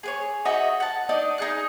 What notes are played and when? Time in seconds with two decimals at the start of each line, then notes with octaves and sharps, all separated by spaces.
0.03 G#4 B4 C#5
0.45 D#4 F#4 D#5 E5
0.80 F#5 A5
1.09 D4 D#4 D#5
1.38 D#4 G#4 F#6